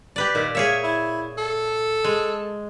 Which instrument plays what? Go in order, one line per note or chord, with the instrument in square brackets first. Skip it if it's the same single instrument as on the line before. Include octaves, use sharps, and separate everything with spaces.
[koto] G4 B4 D5
[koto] A#2 [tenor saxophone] D#3
[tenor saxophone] A#3 [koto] G#4 C#5 E5
[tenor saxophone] E4
A4
[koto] G#3